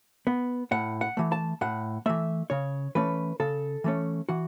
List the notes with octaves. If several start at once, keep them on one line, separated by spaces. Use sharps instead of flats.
B3
A2 F#5
F#5
E3 A3
A5
A2 F#5
E3 A3 E5
C#3 C#5
E3 A3 C#4 B4
C#3 A4
E3 A3 C#4
E3 F#4